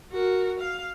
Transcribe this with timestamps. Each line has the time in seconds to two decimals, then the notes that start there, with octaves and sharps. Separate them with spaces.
0.12 F#4 A#4
0.60 F5